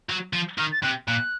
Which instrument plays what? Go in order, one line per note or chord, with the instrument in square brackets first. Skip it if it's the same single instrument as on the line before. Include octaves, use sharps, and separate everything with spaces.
[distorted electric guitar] F#3
F3
[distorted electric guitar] D#3 [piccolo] F6
[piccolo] A6
[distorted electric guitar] C3 [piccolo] F#6
[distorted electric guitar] A#2 [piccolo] F#6